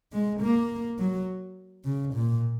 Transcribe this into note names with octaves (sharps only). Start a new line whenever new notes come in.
G#3
A#3
F#3
C#3
A#2